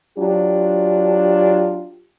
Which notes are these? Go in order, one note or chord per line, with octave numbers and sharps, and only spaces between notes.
F#3 D4 F4 G4